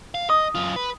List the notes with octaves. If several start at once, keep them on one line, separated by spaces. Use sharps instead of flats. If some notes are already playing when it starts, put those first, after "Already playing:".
F5
D#5 D#6
F#2 F4
B4